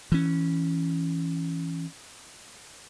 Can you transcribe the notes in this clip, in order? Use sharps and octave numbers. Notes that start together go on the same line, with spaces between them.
E3 C#4